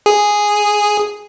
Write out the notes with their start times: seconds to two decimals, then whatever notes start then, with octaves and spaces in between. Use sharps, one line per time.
0.06 G#4